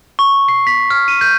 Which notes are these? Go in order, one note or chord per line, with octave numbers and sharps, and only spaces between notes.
C#6
C7
B6
F6
D#7
G6